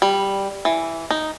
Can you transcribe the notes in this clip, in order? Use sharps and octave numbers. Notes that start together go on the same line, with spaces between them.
G3
E3
D#4